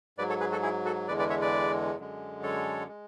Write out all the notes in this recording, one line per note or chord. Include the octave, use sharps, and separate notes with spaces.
G#2 F#3 B4 D5
A4 C#5
G#4 B4
F#4 A4
E4 G#4
F#4 A4
E2 D3 G#3 B4 D5
B4 D5
C#5 E5
B4 D5
F#2 D3 G#3
A4 C#5
G#3